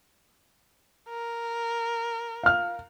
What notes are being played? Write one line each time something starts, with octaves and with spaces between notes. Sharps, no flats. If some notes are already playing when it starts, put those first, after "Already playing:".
A#4
F5 F6